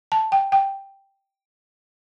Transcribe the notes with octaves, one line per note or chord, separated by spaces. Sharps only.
A5
G5
G5